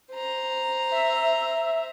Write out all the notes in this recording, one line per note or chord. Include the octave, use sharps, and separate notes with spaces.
C5 A#5
E5